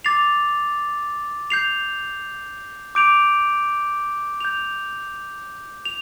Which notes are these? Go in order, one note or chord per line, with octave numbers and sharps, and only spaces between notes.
D6 A6 C7 F7
G6 C7 F7
D6 G6 D7 F7
G6 F7
F7